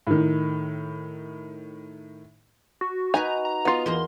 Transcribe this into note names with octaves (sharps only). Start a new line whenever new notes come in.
A2 D#3
F#4
D#4 F#4 B4 G#5 A#5
A#5
B3 F4 D#5
E2 A#3 A#5 C6